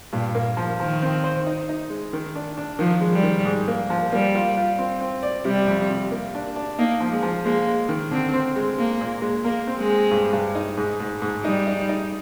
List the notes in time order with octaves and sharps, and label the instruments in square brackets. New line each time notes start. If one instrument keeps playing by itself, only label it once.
[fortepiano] G2 [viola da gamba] A#2
[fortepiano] A#3
F3
[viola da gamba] D#3 [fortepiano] F3
[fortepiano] C4
C5
D#4
D#4
G#3
D#3
D4
D4
[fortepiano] D#3 [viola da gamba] F3
[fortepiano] G#3
[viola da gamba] G3
[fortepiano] D#3
G#2
A#3
F3
[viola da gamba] G3 [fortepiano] A#3
[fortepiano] F4
F4
C4
C4
D5
[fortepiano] C3 [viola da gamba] G3
[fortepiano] F2
C3
A#3
D4
D4
[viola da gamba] A#3 [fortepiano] D#4
[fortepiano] F3
[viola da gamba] G#3
[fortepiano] F3
[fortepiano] G#3 [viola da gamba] A#3
[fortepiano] G#3
D#3
[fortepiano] D3 [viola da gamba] C4
[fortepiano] C4
G#3
[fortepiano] G#3 [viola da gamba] A#3
[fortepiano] A#2
G#3
[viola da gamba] A#3 [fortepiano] A#4
[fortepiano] C4
[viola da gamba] G#3
[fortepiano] C4
G2
G2
D#4
G#2
G#2
G#2
[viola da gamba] G3 [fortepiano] D#4
[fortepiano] D#4
D#4